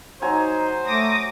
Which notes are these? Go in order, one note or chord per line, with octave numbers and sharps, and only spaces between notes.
F#3 D#4 C5 G#5 A#5
A3 D6 D#6 A#6